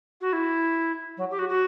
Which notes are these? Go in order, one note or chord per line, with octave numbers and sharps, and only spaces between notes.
F#4
E4
F#3
G4
F#4
F#4